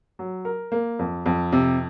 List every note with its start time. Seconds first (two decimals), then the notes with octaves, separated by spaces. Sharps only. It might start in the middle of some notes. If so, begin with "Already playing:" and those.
0.19 F#3
0.45 A#4
0.72 A#3
0.99 F2
1.26 F2
1.53 C3